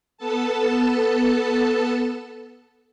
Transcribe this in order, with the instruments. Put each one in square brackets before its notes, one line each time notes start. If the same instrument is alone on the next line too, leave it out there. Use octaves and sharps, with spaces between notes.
[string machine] B3 A4 A5